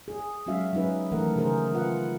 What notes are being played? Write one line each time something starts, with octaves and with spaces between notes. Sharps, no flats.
G#4
F#3 G#3 C#4 F#4 E5 F5
F#3 C#4 D#4 G#4 B4
D#3 E3 A3 A4 A#4 F#5
C#3 A3 G#4 A#4 C5
F4 B4 F#5